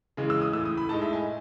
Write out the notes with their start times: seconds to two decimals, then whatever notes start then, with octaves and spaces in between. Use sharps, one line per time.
0.17 C#3 E3 G#3
0.30 E6
0.42 D#6
0.53 A2 E3 A3 E6
0.65 D#6
0.77 B5
0.89 A2 G#3 D#4 A5
1.02 E5
1.13 G#5